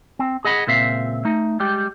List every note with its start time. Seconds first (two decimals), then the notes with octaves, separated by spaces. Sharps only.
0.19 C4
0.45 G#4 D#5 F#5 B5
0.67 C#2 A#2 C4 E5 F5
1.25 A3 D#4
1.60 G3 G#3 G4